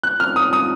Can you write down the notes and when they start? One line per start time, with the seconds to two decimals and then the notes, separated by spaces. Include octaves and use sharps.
0.03 F#6
0.20 F6
0.36 D#6
0.53 D#6